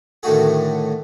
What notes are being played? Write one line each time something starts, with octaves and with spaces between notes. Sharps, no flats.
A2 D3 D#3 A3 F#4 G#4